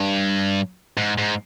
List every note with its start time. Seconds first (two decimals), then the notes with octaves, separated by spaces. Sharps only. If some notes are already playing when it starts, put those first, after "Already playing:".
Already playing: G2
0.97 G#2
1.18 G#2